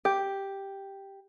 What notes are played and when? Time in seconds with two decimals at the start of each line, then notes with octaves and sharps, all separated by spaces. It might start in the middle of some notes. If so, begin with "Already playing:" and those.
0.05 G4